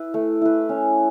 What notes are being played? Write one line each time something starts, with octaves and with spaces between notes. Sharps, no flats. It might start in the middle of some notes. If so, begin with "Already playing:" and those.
Already playing: E4 B4
A3
E4 B4
C#4